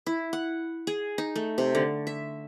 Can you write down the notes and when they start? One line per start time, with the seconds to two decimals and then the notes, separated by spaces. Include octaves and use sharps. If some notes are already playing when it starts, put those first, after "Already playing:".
0.07 E4
0.33 F#5
0.87 G#4
1.18 D#4
1.36 A3
1.58 C3
1.75 D3
2.07 E5